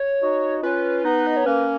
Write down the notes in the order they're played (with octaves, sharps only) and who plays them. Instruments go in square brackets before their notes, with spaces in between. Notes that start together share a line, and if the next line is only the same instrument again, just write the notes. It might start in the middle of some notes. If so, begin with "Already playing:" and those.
Already playing: [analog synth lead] C#5
[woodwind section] D#4 F#4
[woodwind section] C#4 F4 [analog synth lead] B4
[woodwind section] B3 D#4
[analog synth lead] D#5
C#5
[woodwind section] A#3 C#4 [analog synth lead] B4